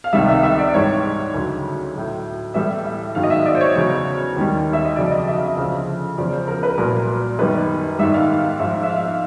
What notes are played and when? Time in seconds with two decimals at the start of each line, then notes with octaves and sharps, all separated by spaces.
0.04 F5
0.13 C#2 C3 D#3 G3 E5
0.29 E5
0.43 E5
0.58 D5
0.74 G#2 E3 G3 C#5
1.34 D2 C#3 F#3
1.95 A2 F#3
2.54 A2 E3 G3 E5
2.85 E5
3.15 G#2 D#3 F#3 F5
3.23 D#5
3.30 E5
3.46 D5
3.55 C5
3.61 C#5
3.75 E2 C#3 F#3
4.36 D#2 D#3 G3
4.73 E5
4.85 D#5
4.96 F2 C#3 F#3 D5
5.11 D#5
5.27 E5
5.35 F5
5.42 E5
5.57 D2 C#3 F3
6.17 E2 C#3 F3 D5
6.33 C5
6.48 A#4
6.63 B4
6.78 C2 A#2 F#3 A#4
7.39 F#2 D#3 G3 B4
7.99 G#2 D#3 G3 E5
8.14 F5
8.45 F5
8.59 G#2 F3 E5
8.83 E5
8.90 F5